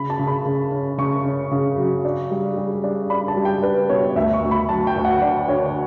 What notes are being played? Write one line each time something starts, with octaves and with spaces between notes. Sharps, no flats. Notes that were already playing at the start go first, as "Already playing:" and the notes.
Already playing: C#3 B5
A5
C#3
B5
C#3
C#4
C#3 C#6
C#4
C#3
F#3
D4
G3
G3
D4
D4 B5
A5
G3
G5
D4 B4
B2 C#5
D2 E5
C#6
D2
B5
F#3 A5
G5
D2
F#5
D3 D5
D3 C#5